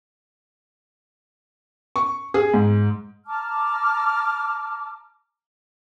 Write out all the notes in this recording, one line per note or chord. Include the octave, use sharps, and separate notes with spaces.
C#6
G#4
G#2
A5 A#5 D6 F6